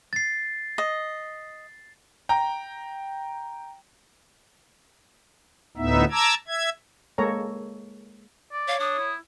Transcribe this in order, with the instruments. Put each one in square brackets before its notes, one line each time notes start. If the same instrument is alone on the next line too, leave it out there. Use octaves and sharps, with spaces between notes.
[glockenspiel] A6 C7
[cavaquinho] D#5
[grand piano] G5 A#5
[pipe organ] D2 A2 B3 D#4 E5
A5 A#5 D6 E6 G#6
E5 G#6
[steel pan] G#3 A#3 A4 C#5 A#5
[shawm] D5
[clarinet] C#5 [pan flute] F5
[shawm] D4 [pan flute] D#6
[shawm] E4